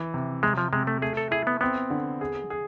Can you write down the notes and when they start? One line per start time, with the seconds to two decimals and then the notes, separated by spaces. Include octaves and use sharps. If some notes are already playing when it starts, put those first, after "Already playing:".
Already playing: E3
0.14 C3
0.43 C3 G#3
0.58 F3
0.73 C3 G#3
0.87 A3
1.02 A3 G#4
1.17 A4
1.31 E4 G#4
1.47 B3
1.61 B3 C4
1.90 D3
2.21 G#4
2.50 G#4